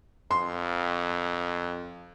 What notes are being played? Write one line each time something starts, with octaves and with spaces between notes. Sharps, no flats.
F2 C6